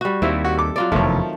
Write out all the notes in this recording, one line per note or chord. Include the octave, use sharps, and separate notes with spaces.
G3 F#4
D#2 C4 E4 E5 F5
F#4
A4 D6
F#3 F4 D5
F1 E2 D#3 F3 A3 C#5